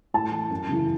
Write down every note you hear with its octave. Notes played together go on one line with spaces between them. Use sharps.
A2 A5
E3
F#2
C#3 E3